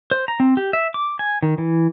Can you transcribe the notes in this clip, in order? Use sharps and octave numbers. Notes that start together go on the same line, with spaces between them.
C5
A#5
C4
G4
E5
D6
G#5
D#3
E3